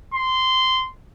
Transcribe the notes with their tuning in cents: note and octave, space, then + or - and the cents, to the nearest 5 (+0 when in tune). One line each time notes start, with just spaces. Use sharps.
C6 -15